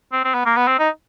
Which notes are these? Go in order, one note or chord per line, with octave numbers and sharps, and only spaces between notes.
C4
C4
B3
A#3
B3
C4
D#4